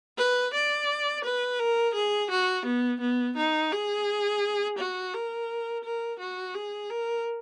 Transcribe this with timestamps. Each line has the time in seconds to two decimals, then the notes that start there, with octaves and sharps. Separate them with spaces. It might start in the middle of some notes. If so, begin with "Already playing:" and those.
0.18 B4
0.54 D5
1.24 B4
1.59 A#4
1.94 G#4
2.30 F#4
2.66 B3
3.00 B3
3.37 D#4
3.72 G#4
4.78 F#4
5.13 A#4
5.84 A#4
6.20 F#4
6.55 G#4
6.90 A#4